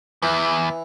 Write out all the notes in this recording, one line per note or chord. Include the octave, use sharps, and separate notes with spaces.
E2 E3